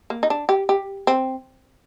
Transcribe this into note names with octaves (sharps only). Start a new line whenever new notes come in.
A#3
D#4
D4
G4
G4
C4